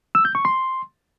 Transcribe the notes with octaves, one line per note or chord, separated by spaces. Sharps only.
E6
G6
C#6
C6